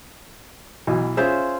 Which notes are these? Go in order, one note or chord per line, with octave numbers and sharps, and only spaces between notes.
B1 B2 E3
C#4 F4 G#4 C5 E5